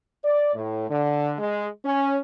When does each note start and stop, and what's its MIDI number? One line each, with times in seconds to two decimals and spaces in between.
0.25 0.52 74
0.55 0.86 45
0.89 1.33 50
1.39 1.68 56
1.85 2.18 61